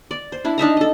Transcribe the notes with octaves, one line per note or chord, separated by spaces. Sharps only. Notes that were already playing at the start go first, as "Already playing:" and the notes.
D5
C5
D4 E4
D4 D#4 E5 A#5
A4 D#5